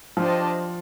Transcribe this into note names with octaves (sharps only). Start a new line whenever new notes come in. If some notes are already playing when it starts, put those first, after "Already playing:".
F3 D4 G4 C5 D#5 A5